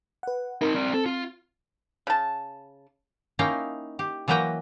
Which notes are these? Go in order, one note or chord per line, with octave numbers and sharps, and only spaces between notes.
B4 F#5
C4 D#4 A#4
C4 D5
C4 A4
F4
C#3 A5
A#3 C#4 D#4 E4 F5 G5
G4
E3 F#3 A#3 B4 G5 A#5